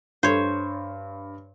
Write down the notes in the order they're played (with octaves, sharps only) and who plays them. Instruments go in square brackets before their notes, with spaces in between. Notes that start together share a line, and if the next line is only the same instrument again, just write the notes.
[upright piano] G2 [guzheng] C5 C#5